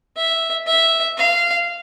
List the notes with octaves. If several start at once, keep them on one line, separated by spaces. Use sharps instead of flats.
E5
E5
F5